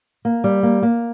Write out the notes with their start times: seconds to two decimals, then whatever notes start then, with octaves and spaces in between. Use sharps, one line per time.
0.25 A#3
0.44 G3
0.63 A#3
0.82 A#3